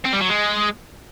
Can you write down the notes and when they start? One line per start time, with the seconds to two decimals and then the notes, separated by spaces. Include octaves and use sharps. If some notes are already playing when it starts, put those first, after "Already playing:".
0.05 C4
0.13 G3
0.21 F#3
0.29 G#3